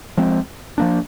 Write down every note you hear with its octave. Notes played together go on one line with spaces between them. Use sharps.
F3 G#3 C4
F3 A#3 D4